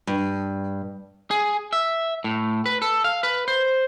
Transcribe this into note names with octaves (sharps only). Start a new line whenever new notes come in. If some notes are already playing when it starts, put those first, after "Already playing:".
G2
G#4
E5
A2
B4
A4
F5
B4
C5